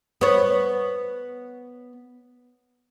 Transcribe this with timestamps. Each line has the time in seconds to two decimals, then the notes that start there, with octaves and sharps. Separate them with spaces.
0.21 B3 C#5